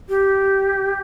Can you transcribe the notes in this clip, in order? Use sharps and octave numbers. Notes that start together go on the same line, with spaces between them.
G4